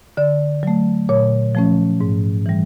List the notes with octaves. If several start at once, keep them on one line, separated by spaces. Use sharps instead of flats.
D3 D5
F#3 A3
A#2 C#5
F3 A3 C#4
G#2
E3 G3